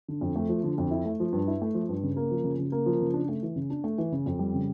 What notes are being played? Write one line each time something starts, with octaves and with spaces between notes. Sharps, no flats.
D3
F2
A3
F3
D3
F2
E4
A3
F3
G2
E4
A3
F3
G2
C#3
A#3
F3
C#3
C#3
A#3
F3
C#3
D4
A3
E3
C#3
D4
A3
E3
C#3
F2
G3
C#3